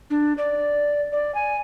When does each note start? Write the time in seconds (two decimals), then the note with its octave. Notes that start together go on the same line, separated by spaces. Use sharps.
0.10 D4
0.38 D5
1.12 D5
1.35 G#5